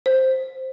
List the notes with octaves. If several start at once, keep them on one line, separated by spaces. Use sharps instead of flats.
C5